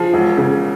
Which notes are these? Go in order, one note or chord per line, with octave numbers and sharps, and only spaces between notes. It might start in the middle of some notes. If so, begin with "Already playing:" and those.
Already playing: F3 G#4
E1
C#3